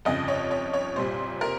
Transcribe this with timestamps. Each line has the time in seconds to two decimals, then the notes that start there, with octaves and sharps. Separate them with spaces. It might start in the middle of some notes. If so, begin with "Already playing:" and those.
0.05 G1 F2 C#3 D#5
0.28 C#5
0.51 C#5
0.73 C#5
0.96 C2 A#2 G3 C5
1.41 A#4